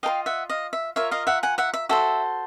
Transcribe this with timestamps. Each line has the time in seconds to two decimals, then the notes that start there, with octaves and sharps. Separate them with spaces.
0.03 F4 A#4 D#5 F5 G5
0.26 E5 F#5
0.50 D#5 F5
0.73 E5
0.96 F4 A#4 C#5 E5
1.11 D#5 F5
1.27 E5 F#5
1.43 F#5 G#5
1.58 E5 F#5
1.74 E5
1.89 F#4 A4 C5 E5